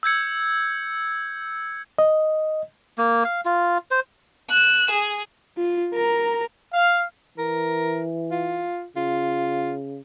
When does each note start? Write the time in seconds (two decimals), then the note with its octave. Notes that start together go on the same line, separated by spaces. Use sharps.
0.03 E6 G6 G#6 C#7
1.99 D#5
2.98 A#3
3.25 F5
3.45 F4
3.91 C5
4.49 F#6 E7
4.90 G#4
5.57 F4
5.94 A#4 A#5
6.74 F5
7.38 E3 A#4
8.31 F4
8.96 C#3 F4